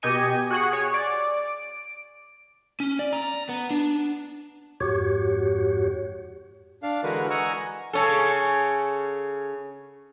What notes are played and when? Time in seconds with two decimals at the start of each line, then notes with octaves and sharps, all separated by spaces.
0.02 B2 G4 D#5 G#5 C#7 D#7
0.50 F#4 G#4 F#5
0.72 G#4 C#5
0.94 D5
1.48 D7
2.80 C#4
2.99 D5
3.13 A#5
3.49 B3
3.71 D4
4.80 F2 G#2 F#4 G4 C#5
6.83 D4 F5
7.03 D3 E3 G#3 F#4 A#4 B4
7.30 D#5 F#5 G#5 A#5 C#6 E6
7.93 C#3 C#4 A4